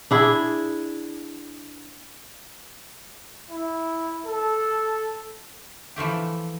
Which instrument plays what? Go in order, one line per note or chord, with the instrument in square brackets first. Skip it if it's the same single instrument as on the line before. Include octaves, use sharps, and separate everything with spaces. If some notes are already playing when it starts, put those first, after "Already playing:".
[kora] D4 E4 G#4
[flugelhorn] E4
A4
[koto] E3 F3 A3 G4